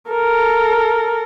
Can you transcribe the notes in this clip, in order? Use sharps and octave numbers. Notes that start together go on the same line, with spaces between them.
A4 A#4